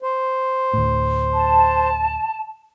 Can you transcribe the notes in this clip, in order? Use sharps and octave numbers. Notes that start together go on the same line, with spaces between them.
C5
D2 A2
A5